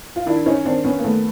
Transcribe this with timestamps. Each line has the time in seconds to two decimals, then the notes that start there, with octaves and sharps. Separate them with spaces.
0.16 F4
0.26 D#3 D4 E4
0.46 C#4 D#4
0.65 D#3 C4 D4
0.84 B3 C#4
0.99 A#3
1.04 D#3 A3 B3